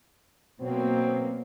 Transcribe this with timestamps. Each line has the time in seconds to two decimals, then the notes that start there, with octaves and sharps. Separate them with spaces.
0.60 B2 F#3 A#3 C4